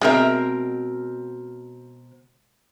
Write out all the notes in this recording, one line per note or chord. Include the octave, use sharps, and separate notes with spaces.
B2 G#3 C4 A#4 E5